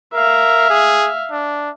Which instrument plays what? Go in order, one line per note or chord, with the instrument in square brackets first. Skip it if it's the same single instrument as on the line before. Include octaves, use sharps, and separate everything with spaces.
[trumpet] A#4 [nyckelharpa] E5 F5
[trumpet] G#4
D4